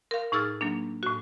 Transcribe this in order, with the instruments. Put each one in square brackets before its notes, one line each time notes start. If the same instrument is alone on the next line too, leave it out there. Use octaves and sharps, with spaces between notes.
[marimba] A#4 F5
A2 D#4 G#4 E6 F6 A6
F#3 A#3 D4
A2 F#4